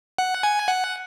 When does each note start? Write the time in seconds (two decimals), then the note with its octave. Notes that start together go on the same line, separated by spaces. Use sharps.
0.18 F#5
0.43 G#5
0.68 F#5